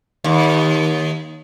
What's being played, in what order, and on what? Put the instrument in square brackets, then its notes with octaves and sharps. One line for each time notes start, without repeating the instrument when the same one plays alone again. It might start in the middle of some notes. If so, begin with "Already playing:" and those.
[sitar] D#2